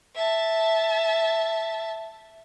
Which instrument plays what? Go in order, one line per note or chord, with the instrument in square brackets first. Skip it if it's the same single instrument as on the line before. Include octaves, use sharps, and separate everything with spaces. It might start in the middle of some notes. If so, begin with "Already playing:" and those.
[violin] E5 A5